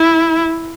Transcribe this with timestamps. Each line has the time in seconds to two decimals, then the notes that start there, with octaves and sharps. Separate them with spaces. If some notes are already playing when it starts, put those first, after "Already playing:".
Already playing: E4